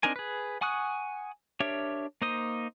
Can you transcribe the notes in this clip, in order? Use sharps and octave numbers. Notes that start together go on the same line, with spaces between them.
C4 D4 D#4 A#4 G#5
G#4 B4
F#5 G#5 C#6 D#6 F#6
D4 G4 A#4 C#5 E5
A#3 D#4 C5 D#6